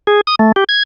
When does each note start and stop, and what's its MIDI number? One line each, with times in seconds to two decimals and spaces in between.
0.07 0.21 68
0.27 0.35 87
0.39 0.52 57
0.56 0.64 67
0.69 0.83 92